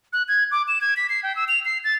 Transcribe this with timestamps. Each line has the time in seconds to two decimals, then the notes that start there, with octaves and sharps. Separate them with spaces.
0.13 F#6
0.28 G#6
0.52 D6
0.68 E7
0.81 G#6
0.97 B6
1.09 C7
1.23 G5
1.36 E6
1.48 F7
1.65 C7
1.84 A6